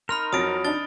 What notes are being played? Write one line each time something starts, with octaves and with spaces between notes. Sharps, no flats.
D#4 A#4 B5 C6 F6 F7
F2 F#3 D#6 A6 A#6 D7
D4 D#4 A6 G7